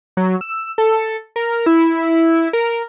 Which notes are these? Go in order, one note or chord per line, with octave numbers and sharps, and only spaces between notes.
F#3
E6
A4
A#4
E4
A#4